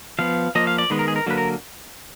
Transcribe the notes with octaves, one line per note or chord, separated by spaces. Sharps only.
F3 B3 F5
F3 A#3 D#5
F5
D5
D#3 G#3 B3 B4
A#4
G#4
A#4
D3 F#3 A#3 B4
A#4